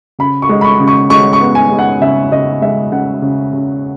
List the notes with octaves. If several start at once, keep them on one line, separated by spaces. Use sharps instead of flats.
C#3 B5
C#6
G#3
B5
C#6
C#3
C#6
G#3 C#6
C#6
B3
G#5
G#3
F#5
C#3 E5
C#3 D#5
G#3 E5
C#3 F#5
C#3
C#3